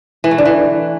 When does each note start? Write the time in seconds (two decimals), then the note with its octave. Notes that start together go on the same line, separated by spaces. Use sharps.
0.24 E3
0.31 A3
0.38 D3
0.46 E3